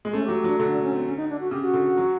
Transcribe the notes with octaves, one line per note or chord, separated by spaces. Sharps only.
G#3
A3 C#4
G4
F#3
G4
F#3 D4
D3 D4
D4
C#4
C4
C#4
D#4
D4
F#4
C#3 G4
F#4
D3
F#3